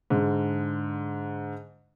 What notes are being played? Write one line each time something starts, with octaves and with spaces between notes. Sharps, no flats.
G#2 D3